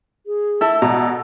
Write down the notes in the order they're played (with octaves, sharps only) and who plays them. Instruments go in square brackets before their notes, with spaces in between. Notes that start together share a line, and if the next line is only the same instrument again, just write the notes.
[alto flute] G#4
[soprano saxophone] E4 [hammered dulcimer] A4
[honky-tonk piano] B2 [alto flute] D5 [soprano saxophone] A#5